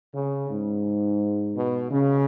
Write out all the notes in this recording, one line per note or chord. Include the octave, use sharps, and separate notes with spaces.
C#3
G#2
B2
C#3